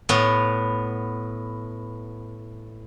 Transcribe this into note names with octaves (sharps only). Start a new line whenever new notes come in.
A2 B3